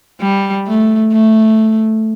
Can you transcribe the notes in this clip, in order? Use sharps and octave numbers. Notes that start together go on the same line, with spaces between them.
G3
A3
A3